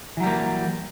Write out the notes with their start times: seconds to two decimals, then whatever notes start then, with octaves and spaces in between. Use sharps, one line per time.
0.17 E3
0.20 F#3
0.23 G3
0.26 A#3